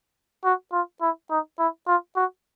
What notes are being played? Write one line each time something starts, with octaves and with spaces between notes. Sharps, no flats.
F#4
F4
E4
D#4
E4
F4
F#4